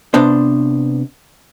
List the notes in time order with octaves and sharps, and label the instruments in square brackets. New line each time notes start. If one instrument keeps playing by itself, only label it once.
[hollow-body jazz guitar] C3 B3 D4 C5